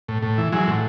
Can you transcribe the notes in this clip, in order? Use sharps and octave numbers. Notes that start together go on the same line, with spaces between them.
A2
A2
E3
E3 F#3 G#3
A2